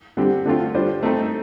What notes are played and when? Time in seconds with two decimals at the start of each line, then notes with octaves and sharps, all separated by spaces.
0.17 D3 G3 C4 G4
0.46 D3 A3 C4 F4
0.74 G3 D4 F4 C5
1.03 A3 C4 D#4 A4